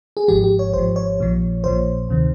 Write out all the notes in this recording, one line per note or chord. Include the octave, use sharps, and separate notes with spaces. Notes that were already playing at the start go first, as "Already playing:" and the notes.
G#4
G#1 G#2 F3 G4
G4
C#5
G#1 G#2 F3 C5
C#5
A#1 A#2 F3
A#1 A#2 F3 C5
D2 C3 D#3